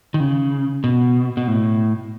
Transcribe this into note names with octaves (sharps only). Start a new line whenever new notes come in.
D#3
C#3
B2
B2
A2